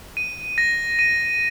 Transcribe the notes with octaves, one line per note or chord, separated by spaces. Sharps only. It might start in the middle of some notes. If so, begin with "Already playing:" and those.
D#7
A#6
D#7